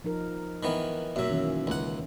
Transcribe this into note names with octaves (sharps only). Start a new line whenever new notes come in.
F3 D#4 A#4
D#3 E3 B3
F#2 B2 F#3 A#3 E5
D#3 E3 C#4
C#2 F#5